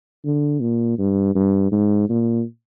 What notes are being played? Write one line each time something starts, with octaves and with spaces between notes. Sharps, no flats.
D3
A#2
G2
G2
G#2
A#2